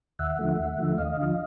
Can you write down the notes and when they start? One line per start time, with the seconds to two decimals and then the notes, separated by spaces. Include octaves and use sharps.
0.19 D#2 E5 F#5
0.39 D3 F3 A3
0.59 D#2
0.78 D3 F3 A3
0.98 D#2 D#5 F5
1.17 D3 F3